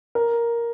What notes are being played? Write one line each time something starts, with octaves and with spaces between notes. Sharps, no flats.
A#4